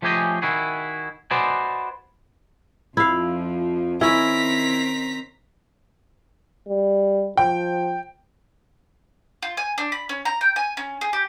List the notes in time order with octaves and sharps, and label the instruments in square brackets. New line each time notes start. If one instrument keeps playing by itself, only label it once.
[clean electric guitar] F3 A3 C#4 G4 G#4 D#5
D#3 E4 F#4 G#4
F#4 B4 C5 D5 D#5 G#5
[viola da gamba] F2 F3 [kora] E4 F5
[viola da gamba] D#3 C4 [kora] C#4 [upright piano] E4 [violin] A#5 B6
[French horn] G3
[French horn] F3 [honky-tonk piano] G5
[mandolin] F4
G#5
D4
B5
C#4
A#5
G5
G#5
C#4
G#4
G4